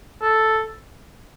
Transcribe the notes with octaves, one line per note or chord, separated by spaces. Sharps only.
A4